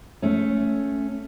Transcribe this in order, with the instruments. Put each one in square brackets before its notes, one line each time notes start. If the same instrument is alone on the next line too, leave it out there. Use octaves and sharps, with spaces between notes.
[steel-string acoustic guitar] A3 C#4